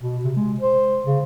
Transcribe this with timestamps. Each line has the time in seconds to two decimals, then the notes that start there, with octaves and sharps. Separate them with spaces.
0.01 B2
0.24 C3
0.36 G#3
0.60 C5
1.05 C#3